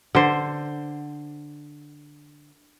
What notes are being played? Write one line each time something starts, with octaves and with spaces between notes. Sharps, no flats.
D3 C5